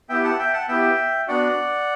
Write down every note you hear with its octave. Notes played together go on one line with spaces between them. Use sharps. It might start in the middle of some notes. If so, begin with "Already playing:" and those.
B3 E4 G4 E5 G5
F#5 A5
E5 G5
F#5 A5
B3 E4 G4 E5 G5
B3 D4 F#4 D5 F#5